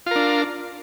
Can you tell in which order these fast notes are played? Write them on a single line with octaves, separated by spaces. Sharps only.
F4 A#4 D4